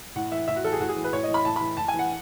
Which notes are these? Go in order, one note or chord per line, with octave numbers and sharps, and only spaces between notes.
A2 F#5
E3 E5
A2 E5
F#4
E3 A4
G#4
A2 F#4
G#4
E3
B4
A2 C#5
D#5
E3
B5
A2 A5
B5
E3
A2 A5
G#5
E3
F#5